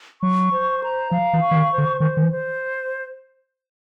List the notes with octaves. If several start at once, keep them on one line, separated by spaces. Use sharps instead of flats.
F#3 C#6
C5
A#5
F3 F5
E3
C#6
E3
D#3
C5
D3
D#3 C5
D#3
E3
C5